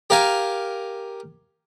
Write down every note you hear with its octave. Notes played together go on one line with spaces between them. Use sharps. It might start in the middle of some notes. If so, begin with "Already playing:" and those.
G4 A#4 F5 G#5